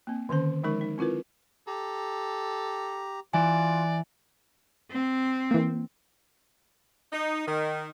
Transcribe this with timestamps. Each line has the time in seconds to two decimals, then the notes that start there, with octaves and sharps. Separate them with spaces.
0.07 A#3 C4
0.29 D3 D#3 C#4 C5
0.63 F3 G#3 D#4 A#4 C#6
0.81 D#4
0.98 C4 E4 F4 A#4 B4
1.67 G4 A4 A#5
3.33 E3 F4 D5 G#5
4.91 C4
5.51 E3 A#3
7.13 D#4
7.47 D#3